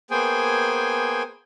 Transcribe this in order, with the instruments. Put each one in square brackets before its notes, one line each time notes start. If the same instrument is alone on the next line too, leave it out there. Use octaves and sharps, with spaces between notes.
[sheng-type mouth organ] A#3 B3 G#4 C5 G5 G#5